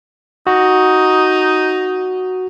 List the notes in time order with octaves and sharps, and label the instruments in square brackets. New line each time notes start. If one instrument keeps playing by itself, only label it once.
[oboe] D#4 [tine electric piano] F#4